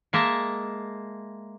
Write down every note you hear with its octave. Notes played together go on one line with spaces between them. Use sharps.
G#3 A#3 E5 A5